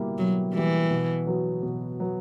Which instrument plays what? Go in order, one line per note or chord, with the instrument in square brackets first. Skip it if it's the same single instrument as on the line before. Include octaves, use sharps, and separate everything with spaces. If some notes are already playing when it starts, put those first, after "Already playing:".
Already playing: [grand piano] B2 G3 A#3 E4 G4
[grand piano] B2 [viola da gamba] F#3
[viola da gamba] E3 [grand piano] G3 A#3 E4 G4
[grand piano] B2
F#3 B3
B2
F#3 B3